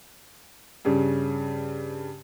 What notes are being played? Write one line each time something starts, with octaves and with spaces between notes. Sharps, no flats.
G2 C#3